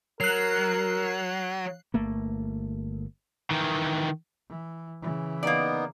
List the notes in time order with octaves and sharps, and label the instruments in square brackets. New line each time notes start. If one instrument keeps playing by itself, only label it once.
[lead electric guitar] F#3 [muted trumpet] A#4 [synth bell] F#6 C7
[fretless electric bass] G1 A3 A#3
[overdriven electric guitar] D#3 E3
[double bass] E3
C#3 E3
[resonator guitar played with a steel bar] A#3 D5 [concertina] B3 D#4